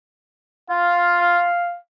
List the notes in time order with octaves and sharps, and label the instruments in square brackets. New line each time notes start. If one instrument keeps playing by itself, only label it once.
[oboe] F4 [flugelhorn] F5